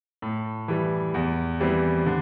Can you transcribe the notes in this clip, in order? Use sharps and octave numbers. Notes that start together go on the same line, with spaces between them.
A2
E3 G3
E2
E3 G3 C4
D3